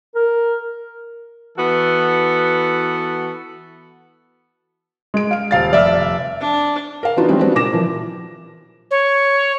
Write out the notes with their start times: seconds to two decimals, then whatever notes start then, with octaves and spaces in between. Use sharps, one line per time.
0.15 A#4
1.58 E3 B3 F#4 A4
5.14 G#3 D7
5.31 F5 D7
5.51 D#1 F5 A6
5.73 F1 D5 E5 F6
6.40 D4
7.03 A#4 F5
7.17 E3 B3 D4 D#4 F4 F#4
7.28 E3 G3 G#3 C4 C#4 D#4
7.40 G3 B3 C4 D4 F#4 C5
7.55 A#2 D6 A#6 E7
7.72 A#2 E3 F3
8.91 C#5